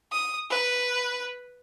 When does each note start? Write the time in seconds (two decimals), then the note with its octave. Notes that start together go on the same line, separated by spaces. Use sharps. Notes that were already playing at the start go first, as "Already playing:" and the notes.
0.11 D#6
0.49 B4